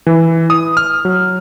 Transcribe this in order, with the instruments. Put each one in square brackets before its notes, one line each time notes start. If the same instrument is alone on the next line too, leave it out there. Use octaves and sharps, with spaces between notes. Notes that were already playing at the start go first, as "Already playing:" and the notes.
[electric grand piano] E3
D#6
F6
F#3